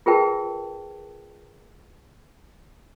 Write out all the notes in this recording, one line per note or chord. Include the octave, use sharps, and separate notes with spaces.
F4 G#4 A#4 B4 G5 A5